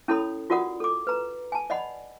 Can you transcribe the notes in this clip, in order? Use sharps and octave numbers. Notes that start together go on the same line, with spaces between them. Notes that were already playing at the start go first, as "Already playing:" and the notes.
C#4 E4 A4 C#5 B5 D#6
F4 F#4 A#4 D5 F#5 D#6
A4 D6
B4 A#5
G#5 A5
D5 D#5 F#5 B5